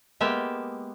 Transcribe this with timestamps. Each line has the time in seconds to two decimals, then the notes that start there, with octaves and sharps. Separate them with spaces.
0.20 G#3 A#3 B3 G4 E5